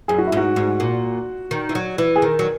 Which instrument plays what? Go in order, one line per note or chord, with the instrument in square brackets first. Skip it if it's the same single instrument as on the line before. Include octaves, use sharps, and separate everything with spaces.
[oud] F#2 [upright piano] G#4
[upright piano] F#4
E4
[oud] G#2 [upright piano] F#4
[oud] G#2
A#2
D#3
E3
F#3
E3
[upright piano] G#4
[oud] D#3 [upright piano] A#4
[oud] F#3